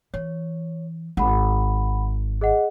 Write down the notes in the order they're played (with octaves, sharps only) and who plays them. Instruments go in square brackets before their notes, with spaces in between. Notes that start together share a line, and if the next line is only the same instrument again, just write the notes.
[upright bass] E3 [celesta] C#5
[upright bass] G#1 [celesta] F#5 B5
[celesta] G#4 D#5 F#5